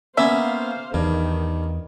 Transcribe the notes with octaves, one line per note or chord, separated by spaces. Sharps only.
A#3 B3 C#4 C5 E5 F5
E2 G2 D#3